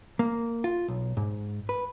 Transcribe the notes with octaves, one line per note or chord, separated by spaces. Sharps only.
A#3
F4
B1
G#2
B4